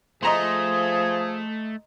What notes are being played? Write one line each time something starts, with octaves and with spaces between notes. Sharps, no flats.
F3 A3 G#4 D#5 A#5 C6